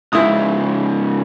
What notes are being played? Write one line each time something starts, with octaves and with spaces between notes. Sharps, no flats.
C#2 G#2 E4 D#6